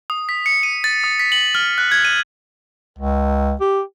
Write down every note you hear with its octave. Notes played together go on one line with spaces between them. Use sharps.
D#6
B6
C#7
D#7
A6
D#6
B6
F#7
F6
F#6
G#6
D#7
C#2
G4